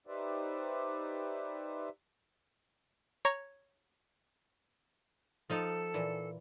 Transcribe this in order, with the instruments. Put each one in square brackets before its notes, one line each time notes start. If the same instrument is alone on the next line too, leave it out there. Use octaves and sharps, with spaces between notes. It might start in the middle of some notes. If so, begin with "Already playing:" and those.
[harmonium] D#4 G4 B4 C5 D5 E5
[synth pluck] C#5 A#5 C#6
[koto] F3 D#4 F4 [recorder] A4
[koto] A#2 E3